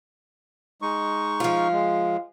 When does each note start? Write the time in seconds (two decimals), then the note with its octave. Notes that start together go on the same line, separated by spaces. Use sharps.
0.82 G#3 D#4 C#6
1.40 F3 F4
1.72 G#3